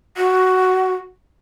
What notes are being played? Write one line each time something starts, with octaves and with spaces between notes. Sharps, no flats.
F#4